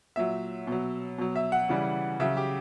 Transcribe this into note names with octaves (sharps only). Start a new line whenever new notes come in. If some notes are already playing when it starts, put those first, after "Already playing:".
A#2 F#3 E5
B2 F#3
B2 F#3
E5
F#5
C#3 E3 G3
C#3 F#3 E5
G4